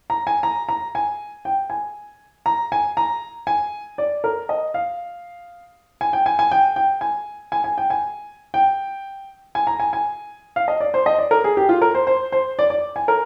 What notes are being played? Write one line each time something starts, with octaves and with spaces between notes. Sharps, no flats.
A#5
G#5
A#5
A#5
G#5
G5
G#5
A#5
G#5
A#5
G#5
D5
A#4
D#5
F5
G#5
G5
G#5
G#5
G5
G5
G#5
G#5
G#5
G5
G#5
G5
G#5
A#5
G#5
G#5
F5
D#5
D5
C5
D#5
D5
A#4
G#4
G4
F4
A#4
C5
C5
C5
D5
D5
G#5
A#4